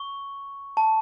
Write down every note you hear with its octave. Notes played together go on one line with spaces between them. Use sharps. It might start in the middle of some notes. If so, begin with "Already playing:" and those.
Already playing: C#6
A5